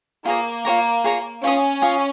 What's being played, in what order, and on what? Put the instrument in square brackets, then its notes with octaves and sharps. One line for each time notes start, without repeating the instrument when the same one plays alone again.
[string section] A#3 [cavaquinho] F4 G#4 C#5 A#5
[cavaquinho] F4 G#4 C#5 A#5
F4 G#4 C#5 A#5
[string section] C#4 [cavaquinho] F4 C#5 G#5 D#6
[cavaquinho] F4 C#5 G#5 D#6